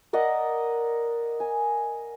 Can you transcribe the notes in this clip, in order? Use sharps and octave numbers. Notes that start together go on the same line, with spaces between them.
A#4 D5 D#5 F#5
G#5